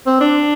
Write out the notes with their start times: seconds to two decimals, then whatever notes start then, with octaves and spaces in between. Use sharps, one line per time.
0.06 C4
0.21 D4